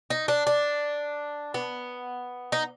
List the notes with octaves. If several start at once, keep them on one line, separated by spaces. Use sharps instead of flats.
D#4
D4
D4
B3
D#4